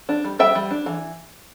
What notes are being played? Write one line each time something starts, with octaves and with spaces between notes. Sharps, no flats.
D4
G3
G3 E5 G5
G3
D4
E3